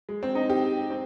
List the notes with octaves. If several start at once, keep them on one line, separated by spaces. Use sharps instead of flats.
G#3
C4
D#4
G4
C4